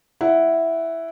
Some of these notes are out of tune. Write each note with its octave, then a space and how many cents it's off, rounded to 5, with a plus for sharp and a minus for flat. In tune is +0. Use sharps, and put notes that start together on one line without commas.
E4 +0 F#5 +5